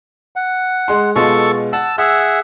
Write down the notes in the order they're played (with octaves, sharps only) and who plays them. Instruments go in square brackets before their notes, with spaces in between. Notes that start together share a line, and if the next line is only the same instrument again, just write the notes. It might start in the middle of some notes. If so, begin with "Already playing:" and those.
[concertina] F#5
[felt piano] G#3 C6
[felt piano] B2 G#3 F4 [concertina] A4 C#6
[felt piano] F#5 [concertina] A5 E6
[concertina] G#4 E5 F#5 [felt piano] E6